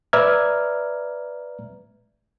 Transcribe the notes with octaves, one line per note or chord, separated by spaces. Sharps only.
B4 D5 E5 A#5 F6 G#6